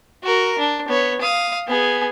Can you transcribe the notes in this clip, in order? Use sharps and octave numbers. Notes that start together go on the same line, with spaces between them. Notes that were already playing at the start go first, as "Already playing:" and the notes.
F#4 A#4
D4
B3 C#5
F5 D#6
B3 G#4